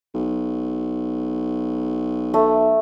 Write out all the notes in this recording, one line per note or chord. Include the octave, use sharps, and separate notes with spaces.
B1
A3